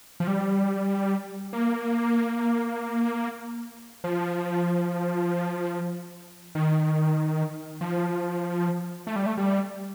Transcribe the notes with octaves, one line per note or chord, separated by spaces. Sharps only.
F3
G3
A#3
F3
D#3
F3
A3
G3
A3
G3